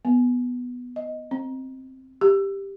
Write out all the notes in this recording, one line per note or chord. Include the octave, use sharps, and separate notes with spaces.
B3
D#5
C4
G4